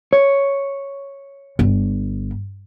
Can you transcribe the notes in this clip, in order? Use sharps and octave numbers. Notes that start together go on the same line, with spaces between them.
C#5
G1